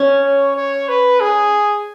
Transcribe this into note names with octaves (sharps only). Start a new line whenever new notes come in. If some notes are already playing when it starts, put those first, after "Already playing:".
Already playing: C#4
C#5
C#5
B4
G#4